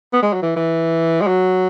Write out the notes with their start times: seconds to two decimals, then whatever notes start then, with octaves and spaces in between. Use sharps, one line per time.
0.13 B3
0.22 G#3
0.33 F#3
0.42 E3
0.56 E3
1.21 G#3
1.27 F#3